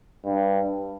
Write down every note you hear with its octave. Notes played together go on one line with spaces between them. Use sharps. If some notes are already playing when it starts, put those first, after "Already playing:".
G2